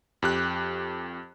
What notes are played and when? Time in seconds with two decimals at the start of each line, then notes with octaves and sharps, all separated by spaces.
0.22 F2 G4 F#6